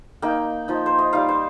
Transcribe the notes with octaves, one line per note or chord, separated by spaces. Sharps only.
A#3 D#4 G5
F3 D#4
C5
D#5
G3 D#4 F5
C5